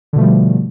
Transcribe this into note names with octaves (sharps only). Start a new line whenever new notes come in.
B2 D3 F3 G3 A3